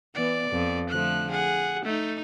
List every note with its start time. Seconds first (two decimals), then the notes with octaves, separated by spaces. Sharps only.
0.15 E3 B3 D5
0.50 F2
0.89 D3 F3 A3 F#6
1.31 G#4 F#5
1.85 A3 D#4